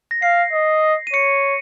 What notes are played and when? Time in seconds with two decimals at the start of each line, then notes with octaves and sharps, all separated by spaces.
0.11 A#6
0.22 F5 C7
0.53 D#5
1.07 D#7
1.13 C#5 C#7